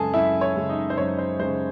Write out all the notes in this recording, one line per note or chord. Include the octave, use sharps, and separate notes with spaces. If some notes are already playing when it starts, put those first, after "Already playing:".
Already playing: F#2 C#3 G#3 G#4 A4 G#5 A5
F#2 E4 E5
C#5
C#3 G#3
D#4 D#5
C5
F#2 C#5
C5
C#3 G#3 C5